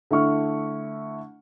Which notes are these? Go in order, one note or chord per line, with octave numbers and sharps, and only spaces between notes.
D3 A3 E4 C#6 F6